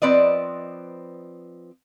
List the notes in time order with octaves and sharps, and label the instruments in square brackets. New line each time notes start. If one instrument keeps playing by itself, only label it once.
[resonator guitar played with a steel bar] F3 C4 B4 D5 D#5